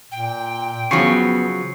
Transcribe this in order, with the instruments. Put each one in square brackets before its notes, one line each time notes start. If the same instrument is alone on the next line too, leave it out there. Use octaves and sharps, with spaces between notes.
[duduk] A#2 [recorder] G5
[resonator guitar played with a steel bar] C#3 F3 F#3 [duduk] B3 [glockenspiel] C#6 C7 C#7